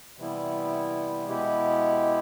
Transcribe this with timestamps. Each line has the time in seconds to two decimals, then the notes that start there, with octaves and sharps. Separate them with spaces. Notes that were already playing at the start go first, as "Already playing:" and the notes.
0.17 C3 E3 G3 B3 E4
1.27 B2 G#3 B3 E4 G4